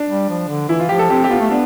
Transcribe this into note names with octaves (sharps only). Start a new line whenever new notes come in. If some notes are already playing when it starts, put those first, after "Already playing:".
Already playing: D4
G3
F3
D3
E3 E4
F4
F3 G4
A4
C4 G4
G4
B3 F4
A3
B3 D4